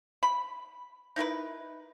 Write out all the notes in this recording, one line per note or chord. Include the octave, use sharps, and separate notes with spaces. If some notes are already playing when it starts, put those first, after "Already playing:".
B5
D#4 E4 A#4 B4